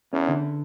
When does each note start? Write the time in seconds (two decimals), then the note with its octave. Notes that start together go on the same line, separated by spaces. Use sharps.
0.12 E2 C#4
0.28 D3